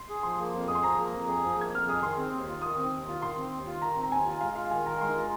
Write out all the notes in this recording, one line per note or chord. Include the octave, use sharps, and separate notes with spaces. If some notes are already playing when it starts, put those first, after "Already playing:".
Already playing: C6
G#4
F3 C6
A#3
F2
G#4 D#6
C6
F3 A#5
A#3
F2
G#4
F3
A#3 G#6
F2 F6
G#4 D#6
D#3 C6
C4
D#2
F4
D#3 D#6
C4
D#2
F4
D#3 C6
C4
D#2
F4
D#3 A#5
C4
A#5
D#2 G#5
F4
G#3 F5
F4 F5
D#3 G#5
A#4 A#5
G#3 C6
F4